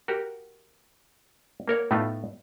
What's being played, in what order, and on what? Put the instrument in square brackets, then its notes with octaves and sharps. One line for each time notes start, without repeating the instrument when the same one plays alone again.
[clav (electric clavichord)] F#4 G4 A#4 F#5
A#3 A#4 C#5 F#5
A2 A3 B3 D#4 F4